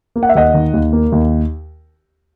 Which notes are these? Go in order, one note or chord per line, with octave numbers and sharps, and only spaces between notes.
A#3
F#5
E5
D#2 D#5 F#5
D#3
D#2
A#3
D#2